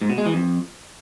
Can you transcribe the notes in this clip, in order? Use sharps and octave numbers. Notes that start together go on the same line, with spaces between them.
G#2
B2
G#3
E3
F2